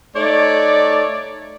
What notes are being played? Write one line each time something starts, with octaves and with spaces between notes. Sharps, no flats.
A3 D#4 C#5 D5